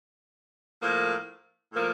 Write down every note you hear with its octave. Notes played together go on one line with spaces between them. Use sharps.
A2 F3 A#3
A2 F3 A#3